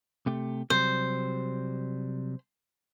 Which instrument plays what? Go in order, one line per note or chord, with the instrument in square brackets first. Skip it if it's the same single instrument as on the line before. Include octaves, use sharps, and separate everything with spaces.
[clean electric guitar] C3 A3 G4
[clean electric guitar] C3 F#3 G3 [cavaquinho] C5